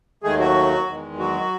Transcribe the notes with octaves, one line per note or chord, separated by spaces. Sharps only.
D#2 D#3 G#3 A3 G#4
F#3 F#4
E2 D#3 G#3
F#3 F#4